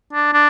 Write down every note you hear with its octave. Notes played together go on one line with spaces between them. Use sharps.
D4
D4